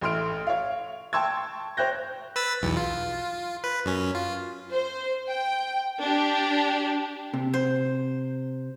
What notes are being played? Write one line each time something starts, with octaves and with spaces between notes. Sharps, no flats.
A1 A2 C6 F6 D7
C#5 F5
G5 A5 C6 C#6 E6 G#6
C5 C#5 G5 F#6 G6 A#6
B4 E6 A6
B1 E2
F4
B4
F#2 C#4
F4
C5
G5
D4 G4
C3
C5